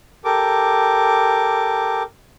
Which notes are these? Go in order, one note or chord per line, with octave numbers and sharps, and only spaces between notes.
G4 A4 A#4 D6